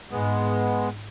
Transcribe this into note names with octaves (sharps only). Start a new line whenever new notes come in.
G#2 G#3 B3